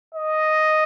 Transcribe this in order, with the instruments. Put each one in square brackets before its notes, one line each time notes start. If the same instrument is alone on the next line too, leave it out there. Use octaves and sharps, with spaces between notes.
[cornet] D#5